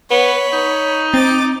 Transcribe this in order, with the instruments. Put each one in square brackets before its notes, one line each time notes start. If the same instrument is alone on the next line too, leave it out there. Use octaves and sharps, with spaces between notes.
[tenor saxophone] B3 [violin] C#5 B5
[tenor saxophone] D#4
[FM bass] C4 [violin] D6 A6